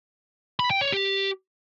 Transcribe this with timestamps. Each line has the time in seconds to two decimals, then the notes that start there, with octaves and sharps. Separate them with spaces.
0.59 B5
0.70 G5
0.81 C#5
0.92 G4